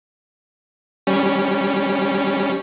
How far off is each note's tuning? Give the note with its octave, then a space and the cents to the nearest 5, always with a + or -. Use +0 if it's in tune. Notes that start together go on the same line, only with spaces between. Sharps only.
G3 +0 C#4 +0